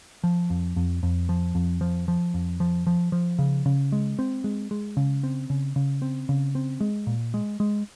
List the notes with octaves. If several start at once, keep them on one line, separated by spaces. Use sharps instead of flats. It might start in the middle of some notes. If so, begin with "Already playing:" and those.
F3
F2
F2
F2
F3
F2
F3
F3
F2
F3
F3
F3
C#3
C#3
G#3
C4
G#3
G#3
C#3
C4
C#3
C#3
C4
C#3
C4
G#3
A#2
G#3
G#3